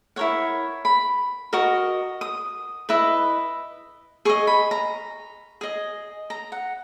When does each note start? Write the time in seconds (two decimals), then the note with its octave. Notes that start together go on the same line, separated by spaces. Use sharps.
0.16 E4 A#4 C#5 F#5
0.85 B5
1.53 F#4 A#4 D#5
2.21 D#6
2.89 E4 B4 D#5
4.25 G#4 D#5 C#6
4.47 B5
4.71 A#5
5.61 G#4 D#5
6.30 A#5
6.52 F#5